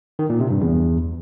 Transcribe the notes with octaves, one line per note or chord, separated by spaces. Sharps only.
D#3
A#2
C3
G2
E2